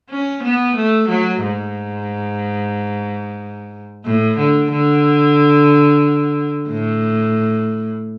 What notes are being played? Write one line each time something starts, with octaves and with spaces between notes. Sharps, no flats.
C#4
B3
A3
F#3
G#2
A2
D3
D3
A2